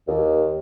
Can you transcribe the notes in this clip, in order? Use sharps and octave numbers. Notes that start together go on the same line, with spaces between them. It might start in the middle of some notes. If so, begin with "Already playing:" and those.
D#2